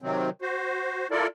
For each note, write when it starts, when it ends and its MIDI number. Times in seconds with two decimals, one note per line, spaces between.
0.02 0.30 48
0.02 0.30 51
0.02 0.30 54
0.02 0.30 60
0.42 1.07 66
0.42 1.07 72
1.11 1.27 64
1.11 1.27 65
1.11 1.27 69
1.11 1.27 70
1.11 1.27 74